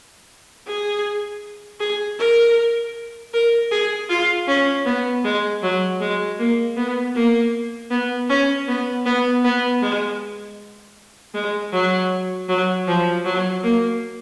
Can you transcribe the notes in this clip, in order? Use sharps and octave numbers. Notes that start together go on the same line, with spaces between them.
G#4
G#4
A#4
A#4
G#4
F4
C#4
B3
G#3
F#3
G#3
A#3
B3
A#3
B3
C#4
B3
B3
B3
G#3
G#3
F#3
F#3
F3
F#3
A#3